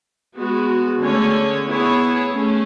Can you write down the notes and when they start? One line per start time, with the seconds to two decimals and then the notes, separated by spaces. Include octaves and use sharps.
0.37 G#3 B3 F#4
1.01 D3 A3 C#4 G#4 C#5
1.66 B3 E4 G#4 C#5
2.30 A3 C#4 G#4